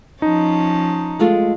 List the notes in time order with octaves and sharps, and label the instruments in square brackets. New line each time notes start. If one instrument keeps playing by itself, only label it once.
[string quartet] F3 C#4 A5 [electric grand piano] D#4
[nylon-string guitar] G#3 A3 F4